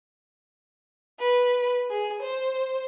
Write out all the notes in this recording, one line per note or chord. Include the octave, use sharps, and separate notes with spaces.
B4
G#4
C5